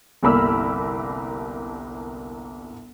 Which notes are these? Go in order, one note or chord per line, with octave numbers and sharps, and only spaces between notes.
G1 C2 A#3 B5 E6 F6